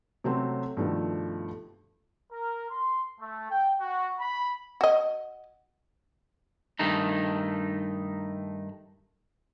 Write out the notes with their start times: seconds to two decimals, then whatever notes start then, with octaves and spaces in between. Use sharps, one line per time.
0.24 C3 F#3 A3 C4 C#4
0.77 G2 B2 D#3 F3 A3
2.32 A#4
2.71 C6
3.20 A3
3.51 G5
3.81 F#4
4.19 B5
4.81 F#4 D#5
6.79 G2 D#3 A3 D#4